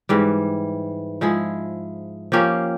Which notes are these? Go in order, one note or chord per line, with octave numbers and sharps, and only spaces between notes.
G#2 E3 G3
F3 G#3 E4 G#4
F3 A#3 C#4 G4